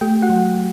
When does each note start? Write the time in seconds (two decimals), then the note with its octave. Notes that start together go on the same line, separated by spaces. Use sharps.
0.01 A3 G4 G5
0.22 F#4 F#5
0.29 F#3